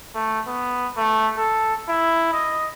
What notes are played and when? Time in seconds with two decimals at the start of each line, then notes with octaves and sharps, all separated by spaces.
0.15 A3
0.47 B3
0.97 A3
1.38 A4
1.89 E4
2.33 D#5